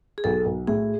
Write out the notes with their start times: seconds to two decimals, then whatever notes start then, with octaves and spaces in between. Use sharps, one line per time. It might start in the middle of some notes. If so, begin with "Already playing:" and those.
0.18 G#4
0.24 B1 A4
0.46 B1
0.67 A2 G#4